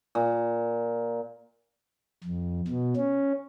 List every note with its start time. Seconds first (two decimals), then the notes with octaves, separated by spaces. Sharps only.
0.15 A#2
2.24 F2
2.67 B2
2.96 C#4